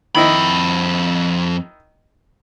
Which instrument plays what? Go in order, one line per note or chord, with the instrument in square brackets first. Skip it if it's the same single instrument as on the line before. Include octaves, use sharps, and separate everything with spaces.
[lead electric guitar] F2 B5 [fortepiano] D#3 E4 D#5